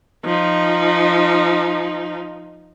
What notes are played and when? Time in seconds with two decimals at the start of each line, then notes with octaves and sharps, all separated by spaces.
0.25 F3 D#4